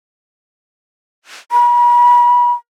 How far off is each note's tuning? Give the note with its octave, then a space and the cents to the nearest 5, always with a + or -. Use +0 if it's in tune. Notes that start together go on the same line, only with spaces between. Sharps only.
B5 -40